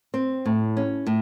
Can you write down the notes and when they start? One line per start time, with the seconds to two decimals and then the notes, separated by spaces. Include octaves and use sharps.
0.14 C4
0.46 A2
0.77 C#4
1.07 A2